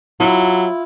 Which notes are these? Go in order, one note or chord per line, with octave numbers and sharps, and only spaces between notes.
F#3 E4 F4